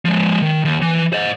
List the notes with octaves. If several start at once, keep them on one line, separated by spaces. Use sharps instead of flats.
F3 G#3
D#3
D#2
E3
C5 D#5